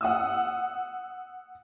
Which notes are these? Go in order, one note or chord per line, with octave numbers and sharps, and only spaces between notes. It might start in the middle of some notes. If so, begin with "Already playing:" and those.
F#5 D#6 E6